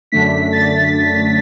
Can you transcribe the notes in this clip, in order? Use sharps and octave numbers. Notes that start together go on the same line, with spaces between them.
F#2 D3 A3 D4 B6
A6